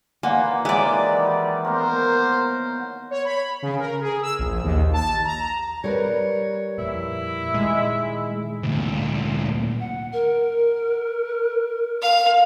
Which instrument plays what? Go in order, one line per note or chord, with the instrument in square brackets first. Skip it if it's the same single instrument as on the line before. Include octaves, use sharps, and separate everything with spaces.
[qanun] A#3 [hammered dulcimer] F4 B4 D5 [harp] F#5 G#5
[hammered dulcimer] D#3 E3 F#3 [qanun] G#3 D5 [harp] E5
[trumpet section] G3
[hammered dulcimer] A#3 B3 F#4 [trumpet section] A#4 C5
[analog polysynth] C#5
B5
C#3
A#4
G#4
E6
A#1
D#2
A5
A#5
[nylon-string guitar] G3 A#4 B4 [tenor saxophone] C#5
[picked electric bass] F2 A#2 [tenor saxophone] E4
[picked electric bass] A#2 D#3 [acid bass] G#3
[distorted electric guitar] D2 A#2
[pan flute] F#5
A#4
[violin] F5